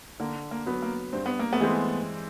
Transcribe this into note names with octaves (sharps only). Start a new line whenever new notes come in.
D3 A#3
A#3
F#3 B3
A#3
G2 C4
B3
A#3
A3 B3
E3 G#3 C4